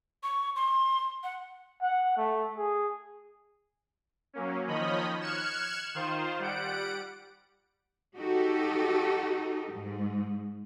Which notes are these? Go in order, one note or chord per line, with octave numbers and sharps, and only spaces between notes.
C#6
C6
F#5
F#5
A3
G#4
F#3 A#3 C#4
D#3 F3 C#5 D#5 B5
F6 F#6 G#6 C#7 E7
D#3 F4 C5
G3 F#5 D7
D#4 F#4 G4 A4
G#2